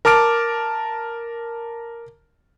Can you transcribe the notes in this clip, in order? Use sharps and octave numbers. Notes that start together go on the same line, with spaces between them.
A#4 A5 D6 F6 D7